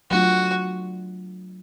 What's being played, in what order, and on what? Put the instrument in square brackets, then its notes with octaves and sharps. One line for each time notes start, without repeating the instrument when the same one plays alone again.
[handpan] F#3 A3 D4 F4 [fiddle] F#4